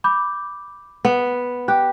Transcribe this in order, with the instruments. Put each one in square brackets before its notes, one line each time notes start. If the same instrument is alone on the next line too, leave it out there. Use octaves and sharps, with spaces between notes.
[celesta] B5 D6 G6
[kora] B3
[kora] G4 [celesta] F#6